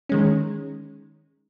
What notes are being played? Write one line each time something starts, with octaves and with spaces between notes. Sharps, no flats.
D#3 G#3 C#4